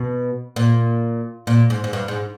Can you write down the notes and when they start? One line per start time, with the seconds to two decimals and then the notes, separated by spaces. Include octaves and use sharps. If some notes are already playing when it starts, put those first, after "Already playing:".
Already playing: B2
0.56 A#2
1.47 A#2
1.70 G#2
1.84 G#2
1.93 G2
2.08 G#2